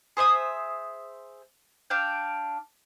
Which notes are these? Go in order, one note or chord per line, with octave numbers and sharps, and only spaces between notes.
G#4 C5 E5 D#6
D4 F5 G5